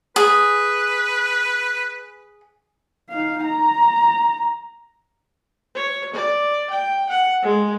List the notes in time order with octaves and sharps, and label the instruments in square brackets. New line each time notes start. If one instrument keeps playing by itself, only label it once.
[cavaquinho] G#4 [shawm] B4
[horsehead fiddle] D#4 F5
A#5
[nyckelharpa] C#5
D5
G5
F#5
G#3